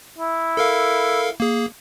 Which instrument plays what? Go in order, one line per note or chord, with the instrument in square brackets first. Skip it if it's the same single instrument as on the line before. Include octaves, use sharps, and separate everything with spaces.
[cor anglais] E4
[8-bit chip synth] A4 A#4 F5
A#3 G#4